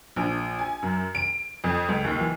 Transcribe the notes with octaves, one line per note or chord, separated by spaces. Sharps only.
A#1
G#5
F#2
D7
F2
C#2
D#2
E3